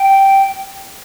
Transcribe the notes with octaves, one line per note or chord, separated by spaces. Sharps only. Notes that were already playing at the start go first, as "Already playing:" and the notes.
Already playing: G5